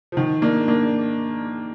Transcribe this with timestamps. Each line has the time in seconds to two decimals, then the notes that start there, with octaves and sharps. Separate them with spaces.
0.12 F3
0.17 D#3
0.42 A#3 D4
0.68 A#3 D4